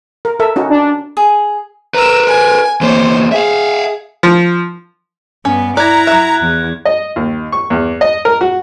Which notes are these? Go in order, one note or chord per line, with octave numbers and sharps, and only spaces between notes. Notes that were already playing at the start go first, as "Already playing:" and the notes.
A#4
A4 A#4 E5
C#4 D#4 F#4
D4
G#4
A#4 B4 A#5 E6
G#5
E2 A#3 C5 C#5
G#4 E5 F5
F3
G2 B3 C#4
E4 D5 A#5 F#6 G#6
F#3 E5 F#6
E2
D#5
D#2
C#6
E2
D#5
A#4
F#4